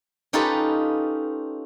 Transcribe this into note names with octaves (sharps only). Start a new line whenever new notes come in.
C#4 D#4 F4 G4 A4 B4